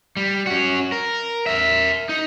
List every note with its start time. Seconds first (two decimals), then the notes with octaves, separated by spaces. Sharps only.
0.17 G3
0.47 C#4 F#4
0.92 A#4
1.47 A#4 E5
2.09 D#4